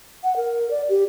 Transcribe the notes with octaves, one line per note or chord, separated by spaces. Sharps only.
F#5
A#4
D5
G4